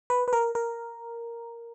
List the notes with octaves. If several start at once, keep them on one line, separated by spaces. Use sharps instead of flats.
B4
B4
A#4
A#4